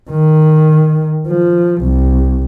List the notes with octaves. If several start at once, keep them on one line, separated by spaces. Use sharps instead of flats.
D#3
F3
C2